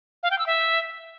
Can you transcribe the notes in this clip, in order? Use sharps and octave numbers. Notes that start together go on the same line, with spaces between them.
F5
G5
E6
E5